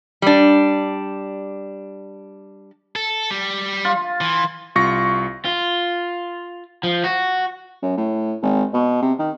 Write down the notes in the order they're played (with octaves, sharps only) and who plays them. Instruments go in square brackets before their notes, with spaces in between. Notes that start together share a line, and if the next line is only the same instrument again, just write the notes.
[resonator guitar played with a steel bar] G3 D4
[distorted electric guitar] A4
G3
[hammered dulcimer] F4
[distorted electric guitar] E3
[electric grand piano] C2 F4 C#6 A#6
[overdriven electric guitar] F4
F3
F#4
[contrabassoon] F#2
A2
G#1
B2
C3
D#3